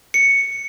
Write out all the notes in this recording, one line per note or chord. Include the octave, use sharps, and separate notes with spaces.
C#7